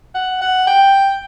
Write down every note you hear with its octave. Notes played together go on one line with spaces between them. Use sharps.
F#5
F#5
G5